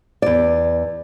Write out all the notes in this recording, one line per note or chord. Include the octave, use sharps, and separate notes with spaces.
E2 D5